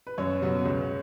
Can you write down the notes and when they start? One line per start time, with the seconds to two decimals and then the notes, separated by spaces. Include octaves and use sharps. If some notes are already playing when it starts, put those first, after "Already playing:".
0.07 B4
0.18 F#2 C#5
0.42 C#3 F#3 B3
0.65 C#2